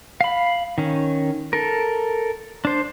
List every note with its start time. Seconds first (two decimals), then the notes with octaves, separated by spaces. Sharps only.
0.21 F5 B5
0.78 D#3 C#4
1.53 A4 A#4
2.65 D4 C5